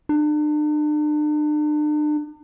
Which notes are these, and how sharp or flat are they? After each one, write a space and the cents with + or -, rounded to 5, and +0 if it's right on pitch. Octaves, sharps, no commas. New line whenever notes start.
D4 +40